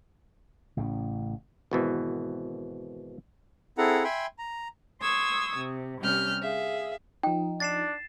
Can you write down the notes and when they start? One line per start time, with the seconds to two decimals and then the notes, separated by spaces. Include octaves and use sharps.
0.77 A1 A2 C#3
1.71 G#1 B2 E3
3.78 C4 E4 G#4 A4 F#5 A#5
4.04 E5 G5 G#5 B5 C6
4.39 A#5
5.01 C6 C#6 D#6 E6 G#6
5.56 C3
6.00 C3 G3 C#4 F6 G6
6.41 G#4 E5 F5
7.23 F3 D#4 G5
7.60 D4 A6 C7 E7